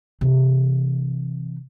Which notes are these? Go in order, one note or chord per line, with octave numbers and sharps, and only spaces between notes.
C3 E3